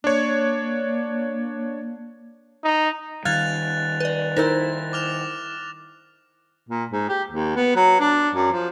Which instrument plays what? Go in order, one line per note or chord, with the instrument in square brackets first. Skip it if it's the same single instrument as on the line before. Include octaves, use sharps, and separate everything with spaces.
[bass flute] A#3 [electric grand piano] D4 C#5
[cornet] D#4
[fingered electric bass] D#3 G3 [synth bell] F5 F6 G#6 [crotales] F#6 A6 F7
[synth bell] B4 D5
[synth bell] D#4 [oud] E4 A#4 C5 [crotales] A#6
[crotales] D6 F6 F7
[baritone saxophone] A#2
G#2
G4
D#2
B3
F#3
D4
F#2
F3